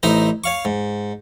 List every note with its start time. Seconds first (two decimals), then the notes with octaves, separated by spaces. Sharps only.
0.03 A1 D#4 E4 C5 A#5
0.44 C#5 F5 C#6
0.65 G#2